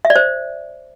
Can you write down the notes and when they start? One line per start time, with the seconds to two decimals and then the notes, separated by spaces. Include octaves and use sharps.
0.05 E5
0.10 D5
0.16 C5